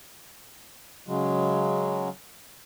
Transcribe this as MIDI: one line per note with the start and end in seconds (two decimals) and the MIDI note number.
1.07 2.09 49
1.07 2.09 54
1.07 2.09 56